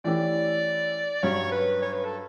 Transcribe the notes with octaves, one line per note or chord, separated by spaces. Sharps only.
E3 A3 C#4 E4 G4 D5
G2 F#3 C#4 C#5
B4
C#5
B4
A4